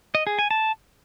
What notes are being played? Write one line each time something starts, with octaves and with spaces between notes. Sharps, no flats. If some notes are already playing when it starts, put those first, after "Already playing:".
D#5
G#4
G#5
A5